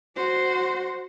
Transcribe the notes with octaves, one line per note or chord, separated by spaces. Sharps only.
F#4 C5